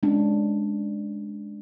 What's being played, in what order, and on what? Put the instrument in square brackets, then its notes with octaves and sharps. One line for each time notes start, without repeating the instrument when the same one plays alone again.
[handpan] G#3 C#4 D4